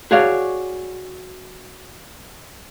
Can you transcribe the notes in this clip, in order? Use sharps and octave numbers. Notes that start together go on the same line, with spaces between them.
F#4 G#4 C#5 D5 F5